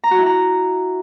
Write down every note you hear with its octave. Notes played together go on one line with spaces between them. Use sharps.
A#5
F#4
E4
A#5